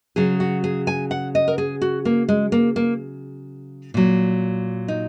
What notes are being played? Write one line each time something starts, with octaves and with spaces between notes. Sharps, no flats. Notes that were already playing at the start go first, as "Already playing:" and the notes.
C#3 F#3 G#4
F#4
G#4
G#5
F#5
D#5
A#4
G#4
F#4
A#3
G#3
A#3
A#3
A#2 F#3
D#4